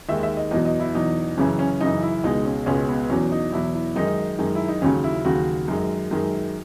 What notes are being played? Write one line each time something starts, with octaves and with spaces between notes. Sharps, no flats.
D#2 D#3 G#3 E5
E5
D#5
E2 B2 F#3 D#5
D#5
E4
E2 B2 F#3 D#4
F#2 C#3 E3 C#4
C#4
F#2 C#3 E3 D#4
E4
C#2 B2 G#3 D#4
C#4
C#2 B2 G#3 C#4
B3
E2 B2 F#3 C#4
D#4
E2 B2 F#3 E4
E4
F#2 D#3 G#3 D#4
F#2 D#3 G#3
E4
D#4
D#2 C#3 F#3 C#4
E4
D#2 C#3 F#3 F#4
F#2 D#3 G#3
F#2 D#3 G#3